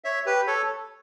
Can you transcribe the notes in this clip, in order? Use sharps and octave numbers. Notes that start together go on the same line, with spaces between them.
C#5 E5
G4 B4
A4 C#5